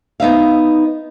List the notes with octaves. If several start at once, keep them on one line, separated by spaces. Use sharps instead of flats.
B3 D#4 E5 F5